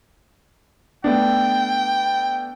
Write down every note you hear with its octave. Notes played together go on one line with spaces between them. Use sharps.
A3 B3 D4 G5